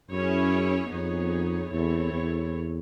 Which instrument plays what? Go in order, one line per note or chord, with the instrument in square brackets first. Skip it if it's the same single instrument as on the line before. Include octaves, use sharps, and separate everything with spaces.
[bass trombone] F#2 [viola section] C#4 E4 G#4 C#5
[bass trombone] F2 [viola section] B3 D#4 G#4 C#5
[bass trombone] E2 [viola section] C4 E4 A4 C#5
[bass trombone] E2